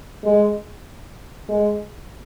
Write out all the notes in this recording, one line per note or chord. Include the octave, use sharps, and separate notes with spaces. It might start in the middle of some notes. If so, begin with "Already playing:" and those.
G#3
G#3